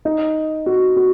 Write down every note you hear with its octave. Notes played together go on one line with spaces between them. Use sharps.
D#4
F#4
F#4